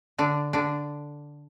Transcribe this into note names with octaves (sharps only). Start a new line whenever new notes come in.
D3 D4
D3 D4